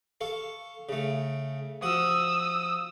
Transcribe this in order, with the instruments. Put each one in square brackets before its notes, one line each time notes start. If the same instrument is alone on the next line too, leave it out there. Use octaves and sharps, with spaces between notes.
[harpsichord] A4 F5 C#6
C#3 A3
[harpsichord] F3 F#4 [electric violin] D#6 E6